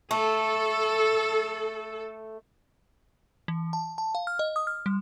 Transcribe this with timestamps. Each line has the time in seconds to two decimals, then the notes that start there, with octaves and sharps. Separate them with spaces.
0.11 A3 A4
3.48 E3
3.73 A5
3.98 A5
4.15 F5
4.27 F6
4.39 D#5
4.56 D#6
4.67 F6
4.86 G3